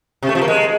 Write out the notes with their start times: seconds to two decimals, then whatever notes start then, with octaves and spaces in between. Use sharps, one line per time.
0.23 C3
0.29 A3
0.35 F3
0.41 A#3
0.48 G#3